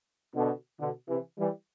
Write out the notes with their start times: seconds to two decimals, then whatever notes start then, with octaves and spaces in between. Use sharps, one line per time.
0.35 B2 D3
0.80 B2 D3
1.09 C3 E3
1.39 E3 G3